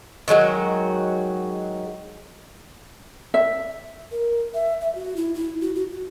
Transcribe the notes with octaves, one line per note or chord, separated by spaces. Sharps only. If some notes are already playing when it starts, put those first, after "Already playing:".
D#3 F#3 G#3 F#4
E5
A#4
E5
E5
F#4
E4
E4
F#4
F#4
F#4